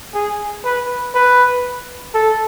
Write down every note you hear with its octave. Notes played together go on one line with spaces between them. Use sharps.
G#4
B4
B4
A4